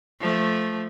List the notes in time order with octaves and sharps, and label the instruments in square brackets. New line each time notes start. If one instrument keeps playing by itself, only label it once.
[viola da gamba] F3 A3